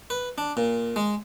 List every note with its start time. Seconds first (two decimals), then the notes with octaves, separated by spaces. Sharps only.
0.10 B4
0.38 D4
0.57 A#2
0.96 G#3